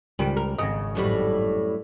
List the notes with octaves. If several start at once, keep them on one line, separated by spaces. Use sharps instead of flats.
C#2 D#3 G3
A#4
G#1 C#3 D#5
F#2 A2 G3